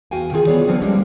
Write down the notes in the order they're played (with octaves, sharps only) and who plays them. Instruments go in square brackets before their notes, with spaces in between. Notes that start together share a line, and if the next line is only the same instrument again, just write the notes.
[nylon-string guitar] E2 F#4 F5 G5 G#5
D#3 E3 F4 F#4 G#4
B3 G#4 C#5 D5
D3 F3 F#3 B3 C4
G3 G#3 A#3 C#4 D4